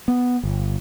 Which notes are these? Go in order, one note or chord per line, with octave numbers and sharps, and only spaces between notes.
B3
G1